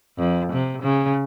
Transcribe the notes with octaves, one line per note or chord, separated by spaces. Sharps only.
F2
C3
C#3